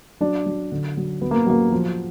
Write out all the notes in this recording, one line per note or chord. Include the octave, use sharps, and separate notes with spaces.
F#3 D4
F#3
D3
F#3
F#3 B3
A#3
F#3 A#3
F3